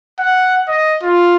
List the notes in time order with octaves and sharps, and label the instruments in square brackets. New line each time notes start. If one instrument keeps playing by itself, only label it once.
[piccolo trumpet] F#5
D#5
F4